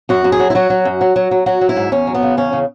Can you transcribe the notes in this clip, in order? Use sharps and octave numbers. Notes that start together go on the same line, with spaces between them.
F#2 F#4
F#2
G#4
F#3
E4
F#3 F#4
F#3
F#2
F#3
F#3
F#3
F#3 F#4
F#3
E4
G#2
E2 C#4
F#3
B3
C#3
E2 C#4
C#3